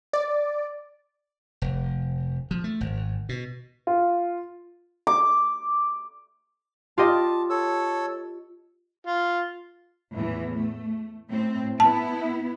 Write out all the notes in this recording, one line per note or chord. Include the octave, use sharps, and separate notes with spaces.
D5
F1
F3
A3
G#1
B2
F4
D6
F4 G4 D#5 A5
A4 C#5 E6
F4
E2 A2 E3
A3
A2 C4
B3 E4 A5